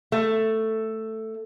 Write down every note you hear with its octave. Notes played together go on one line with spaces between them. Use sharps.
A3